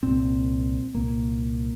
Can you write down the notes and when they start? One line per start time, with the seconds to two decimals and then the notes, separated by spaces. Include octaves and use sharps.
0.03 C2 A#2 C4
0.95 C2 A#2 A#3